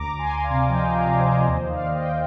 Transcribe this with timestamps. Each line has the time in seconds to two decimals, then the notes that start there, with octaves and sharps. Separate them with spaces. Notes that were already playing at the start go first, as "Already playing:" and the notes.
Already playing: D2 A#5 D6
0.12 D2
0.18 G#5 C6
0.31 D2
0.43 D5 F5
0.49 C3
0.68 F3 D#5 G5
0.88 C3
0.94 D5 F5
1.06 C3
1.18 C5 D#5
1.25 F3
1.44 D#2 C5 D#5
1.64 D#3
1.69 D5 F5
1.82 D#2
1.94 D#5 G5
2.01 D#2